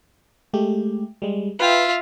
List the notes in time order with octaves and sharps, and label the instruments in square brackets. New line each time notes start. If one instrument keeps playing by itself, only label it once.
[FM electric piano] G#3 A3 G4
G3 G#3
[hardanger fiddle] F4 E5 [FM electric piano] B4 G5